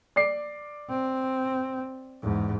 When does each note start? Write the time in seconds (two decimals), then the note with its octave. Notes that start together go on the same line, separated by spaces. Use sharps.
0.16 D5 D6 C7
0.89 C4
2.22 E2 G#2